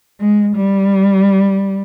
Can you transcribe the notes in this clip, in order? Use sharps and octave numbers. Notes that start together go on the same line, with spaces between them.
G#3
G3